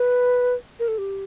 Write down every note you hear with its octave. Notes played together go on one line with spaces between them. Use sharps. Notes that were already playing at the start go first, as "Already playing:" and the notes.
Already playing: B4
A#4
A4
G4